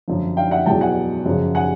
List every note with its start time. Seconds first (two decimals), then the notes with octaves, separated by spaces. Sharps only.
0.08 F#2 D3 F3
0.37 F5 G5
0.51 E5 F#5
0.66 E2 B2 F#3 G5 A5
0.81 F#5 G#5
1.25 F#2 C#3 F3
1.55 F#5 G#5